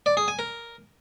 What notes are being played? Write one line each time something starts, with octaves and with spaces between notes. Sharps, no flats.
D5
G#4
G#5
A#4